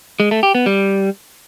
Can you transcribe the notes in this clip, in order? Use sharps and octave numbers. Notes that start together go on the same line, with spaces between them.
G#3
A3
G4
B3
G3